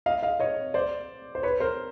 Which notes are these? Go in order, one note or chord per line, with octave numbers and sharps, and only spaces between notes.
D#5 F5
D#5 F5
C#5 D#5
C5 D5
C5
B4 C#5
A#4 C5